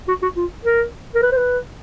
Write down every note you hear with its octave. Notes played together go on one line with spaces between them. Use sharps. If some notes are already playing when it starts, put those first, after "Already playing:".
F#4
F#4
F4
A#4
A#4
B4
C5
B4